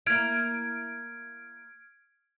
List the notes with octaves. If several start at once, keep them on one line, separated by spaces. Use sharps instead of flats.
A#3 E4 F6 G#6 D7